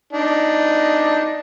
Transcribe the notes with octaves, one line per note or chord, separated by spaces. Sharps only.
D4 D#4